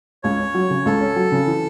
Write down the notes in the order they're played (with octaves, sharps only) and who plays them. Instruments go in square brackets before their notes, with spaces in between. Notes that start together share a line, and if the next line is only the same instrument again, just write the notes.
[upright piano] C#2 [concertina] C#5
[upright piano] C#4
F#3
C#3
[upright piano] C#2 [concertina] A4
[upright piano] C#4
F#3
C#3
E3